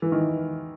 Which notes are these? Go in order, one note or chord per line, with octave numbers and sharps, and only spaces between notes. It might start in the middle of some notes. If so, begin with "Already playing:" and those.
E3
D#3